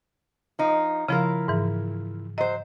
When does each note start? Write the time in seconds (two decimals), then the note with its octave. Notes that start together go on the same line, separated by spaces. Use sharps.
0.59 F3 D#4
1.08 C#3 F3 E4 F4 A#4
1.48 G#2 E3
2.38 F#3 C5 D#5